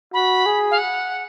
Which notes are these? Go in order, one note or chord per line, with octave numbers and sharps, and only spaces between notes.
F#4 B5
G#4
F5
F#5